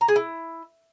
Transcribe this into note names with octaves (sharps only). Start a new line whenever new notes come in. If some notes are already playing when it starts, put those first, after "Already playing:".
A#5
G#4
E4